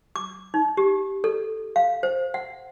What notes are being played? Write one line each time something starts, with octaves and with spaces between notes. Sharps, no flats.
D6
D#4
G4
A4
F5
C5
F#5